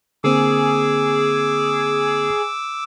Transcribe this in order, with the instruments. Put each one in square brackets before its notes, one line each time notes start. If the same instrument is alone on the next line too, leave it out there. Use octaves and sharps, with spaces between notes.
[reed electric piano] D3 A#3 C4 [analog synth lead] G#4 [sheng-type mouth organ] D6 E6